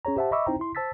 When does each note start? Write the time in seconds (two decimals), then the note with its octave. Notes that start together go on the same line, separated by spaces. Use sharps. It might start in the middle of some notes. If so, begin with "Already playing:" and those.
0.05 C#4 G#4 C#5 A#5
0.16 G4 C5 E5 F#5 A5
0.32 D#5 E5 B5 C#6 D6 E6
0.46 C4 D#4 E4 C5 G5 A#5
0.59 E4 C6
0.75 C5 A5 E6 A6 B6